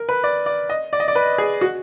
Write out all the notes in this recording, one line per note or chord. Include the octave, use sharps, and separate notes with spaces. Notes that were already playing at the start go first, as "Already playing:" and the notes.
Already playing: A#4
B4
D5
D5
D#5
D5
D#5
D5
B4
G#4
F#4